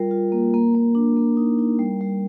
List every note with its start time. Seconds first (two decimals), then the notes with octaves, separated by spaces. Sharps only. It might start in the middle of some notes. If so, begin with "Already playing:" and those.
Already playing: G3 F4 A#4
0.11 F4
0.32 A#3
0.54 A#3
0.75 A#3
0.95 D4
1.17 A#3
1.37 D#4
1.59 D#4
1.79 G3
2.01 G3